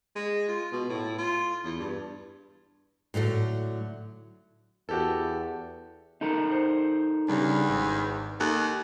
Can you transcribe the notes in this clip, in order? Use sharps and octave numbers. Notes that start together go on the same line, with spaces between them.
G#3
F4
B2
A2
F4
E2
G2
A2 D3 F#3 A3
E2 F#4 G4 A4
D#4 A4 A#4
C5
E2 C#3 G3 D4
G#1
D#2 A4 F#6